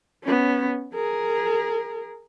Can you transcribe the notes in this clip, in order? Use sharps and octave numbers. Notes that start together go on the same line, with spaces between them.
B3 C#4
G#4 A#4